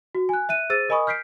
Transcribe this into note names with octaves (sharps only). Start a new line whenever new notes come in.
F#4
G#5 F#6
E5 F#6 D#7
G#4 C5 E6 A6 D#7
A#4 D#5 G#5 B5 C#6 D#6
F6 G6 B6 C7 D7